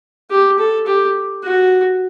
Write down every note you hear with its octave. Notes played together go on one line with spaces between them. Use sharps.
G4
A4
G4
F#4